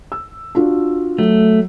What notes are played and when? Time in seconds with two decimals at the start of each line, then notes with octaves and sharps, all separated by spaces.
0.12 E6
0.55 D4 F4 F#4
1.18 F#3 A3